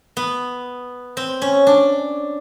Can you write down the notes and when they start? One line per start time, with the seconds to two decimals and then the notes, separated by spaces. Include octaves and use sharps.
0.17 B3
1.17 C4
1.42 C#4
1.67 D4